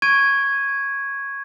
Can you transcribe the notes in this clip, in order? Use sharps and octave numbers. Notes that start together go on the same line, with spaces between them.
C#6 G#6 D7 D#7